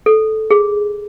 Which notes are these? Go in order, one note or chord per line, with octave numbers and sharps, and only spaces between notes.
A4
G#4